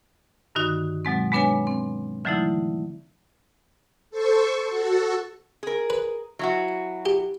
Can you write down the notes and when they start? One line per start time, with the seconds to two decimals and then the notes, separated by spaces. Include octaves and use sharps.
0.55 G2 D3 D#3 D#4 F#4 F#6
1.05 B2 F#3 G#3 C4
1.32 G#3 B3 D4 B4 C#5 G#5
1.67 C4
2.25 D3 E3 F#3 A3 D#4 E4
4.11 A4 C5 C#6
4.70 F#4 A4
5.63 G#4 A#4
5.90 B4
6.39 F#3 E4 F#4
7.06 G4